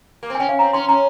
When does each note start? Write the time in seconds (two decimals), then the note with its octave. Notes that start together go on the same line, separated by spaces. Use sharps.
0.23 A#3
0.30 C4
0.35 G#5
0.40 C#4 G5
0.49 F5
0.59 C4 A#5
0.73 C#4 C6
0.88 C#4 A#5